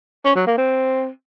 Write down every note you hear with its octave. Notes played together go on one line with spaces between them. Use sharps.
C#4
F#3
A#3
C4